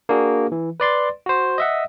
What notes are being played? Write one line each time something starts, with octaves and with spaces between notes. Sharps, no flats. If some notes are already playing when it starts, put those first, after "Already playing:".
A#3 D4 F#4 G#4
E3
B4 D5 C6 A6
F#4 C5
D#5 E5 F#5